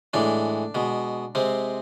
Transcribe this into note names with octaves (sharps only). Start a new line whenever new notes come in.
A2 E3 G#3 D4
B2 G#3
C3 G#3 C4